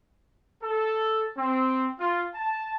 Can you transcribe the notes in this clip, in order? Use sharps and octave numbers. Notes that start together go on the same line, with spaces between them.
A4
C4
F4
A5